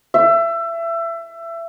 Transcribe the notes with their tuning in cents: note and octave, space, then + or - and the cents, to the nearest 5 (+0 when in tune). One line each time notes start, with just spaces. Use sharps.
E5 +25